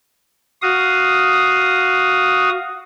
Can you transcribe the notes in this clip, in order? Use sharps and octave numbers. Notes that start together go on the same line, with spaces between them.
F#4 F5 D#6